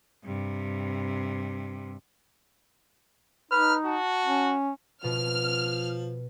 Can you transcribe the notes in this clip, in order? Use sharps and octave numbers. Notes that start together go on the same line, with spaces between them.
G2 C3
D#4 B4 F6
F#4 A5
C#4
B2 F3 F6